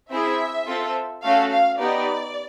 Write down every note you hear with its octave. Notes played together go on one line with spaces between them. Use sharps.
C4 E4 G#4 E5
C4 F4 A4
A3 C#4 F#4 A4 F5
F5
B3 D#4 G4 D5